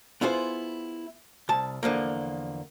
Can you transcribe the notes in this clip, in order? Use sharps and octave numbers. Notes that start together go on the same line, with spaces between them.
B3 E4 F4 G#4 C5
C2 A5
E2 D3 F3 A#3